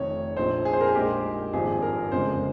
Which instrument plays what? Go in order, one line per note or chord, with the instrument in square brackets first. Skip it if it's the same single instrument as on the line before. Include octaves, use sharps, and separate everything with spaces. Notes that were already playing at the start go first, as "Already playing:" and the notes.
Already playing: [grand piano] F1 F2 D#3 C#5
A#1 A#2 F3 C4 D#4 C5
G#4
C5
A#4
G#4
A#1 A#2 G#3 D#4 G4
G#1 G2 F3 C4 D#4 G#4
A#4
G1 F2 C#3 G#3 C5